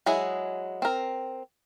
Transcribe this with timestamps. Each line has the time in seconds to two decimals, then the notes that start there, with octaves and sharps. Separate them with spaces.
0.06 F#3 G#3 E4 G#4
0.82 C4 A#4